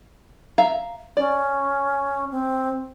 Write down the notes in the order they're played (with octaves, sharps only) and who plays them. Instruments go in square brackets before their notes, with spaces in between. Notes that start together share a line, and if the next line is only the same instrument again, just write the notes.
[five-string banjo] E5 F5 A#5
[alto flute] C#4 [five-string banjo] D5
[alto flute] C4